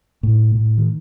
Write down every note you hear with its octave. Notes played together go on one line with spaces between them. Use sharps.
A2
A2
D#3